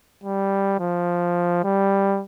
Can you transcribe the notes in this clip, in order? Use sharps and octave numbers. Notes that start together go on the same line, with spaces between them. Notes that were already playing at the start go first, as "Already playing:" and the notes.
G3
F3
G3